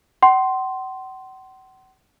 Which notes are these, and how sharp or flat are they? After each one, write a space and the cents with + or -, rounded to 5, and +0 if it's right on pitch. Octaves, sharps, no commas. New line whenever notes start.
F#5 +40 C6 +0